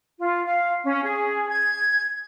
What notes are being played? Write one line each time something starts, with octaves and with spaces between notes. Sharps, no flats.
F4
F5
C#4
G#4
G#6